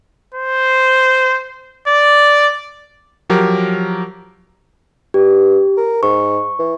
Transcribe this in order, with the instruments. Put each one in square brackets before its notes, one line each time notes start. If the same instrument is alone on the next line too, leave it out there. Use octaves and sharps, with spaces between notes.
[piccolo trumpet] C5
D5
[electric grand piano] F3 F#3 G4 A#4
[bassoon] G2 [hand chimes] G4
[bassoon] A#4
[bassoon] G#2 [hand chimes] C#6
[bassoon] E3